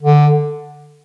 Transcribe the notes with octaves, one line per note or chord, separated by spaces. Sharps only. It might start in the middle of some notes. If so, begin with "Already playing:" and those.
D3